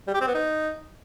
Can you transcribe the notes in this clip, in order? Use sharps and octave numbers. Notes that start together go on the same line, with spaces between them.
G3
G4
C4
B3
D#4